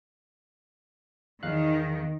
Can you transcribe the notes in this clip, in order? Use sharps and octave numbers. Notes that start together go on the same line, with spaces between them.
E2 D#3 F5 F#6